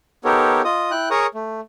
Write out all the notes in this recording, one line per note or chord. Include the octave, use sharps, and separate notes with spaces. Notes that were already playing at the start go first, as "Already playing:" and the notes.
B3 D#4 G4 A4 A#4 C#5
F4 D#5 D#6
E4 G5 F#6
G#4 A#4 C#5 A#5 C#6 D#6
A3